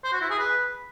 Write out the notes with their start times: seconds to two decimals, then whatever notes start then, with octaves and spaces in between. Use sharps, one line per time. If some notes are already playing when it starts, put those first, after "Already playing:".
0.04 C5
0.13 F#4
0.21 E4
0.30 G#4
0.39 B4